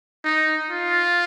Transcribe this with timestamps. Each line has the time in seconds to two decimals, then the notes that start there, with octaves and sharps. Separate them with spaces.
0.24 D#4
0.70 F4